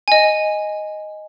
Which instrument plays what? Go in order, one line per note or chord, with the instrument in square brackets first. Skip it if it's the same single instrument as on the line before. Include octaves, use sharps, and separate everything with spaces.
[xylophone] D#5 G#5